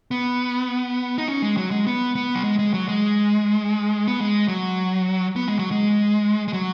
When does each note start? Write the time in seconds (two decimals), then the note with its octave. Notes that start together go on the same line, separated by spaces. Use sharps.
0.11 B3
1.18 D#4
1.28 C#4
1.42 G#3
1.57 F#3
1.71 G#3
1.87 B3
2.15 B3
2.35 F#3
2.44 G#3
2.59 G#3
2.74 F#3
2.88 G#3
4.08 B3
4.20 G#3
4.48 F#3
5.36 B3
5.48 G#3
5.59 F#3
5.71 G#3
6.48 G#3
6.53 F#3